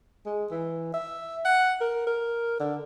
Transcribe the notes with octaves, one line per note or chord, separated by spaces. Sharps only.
G#3
E3
E5
F#5
A#4
A#4
D3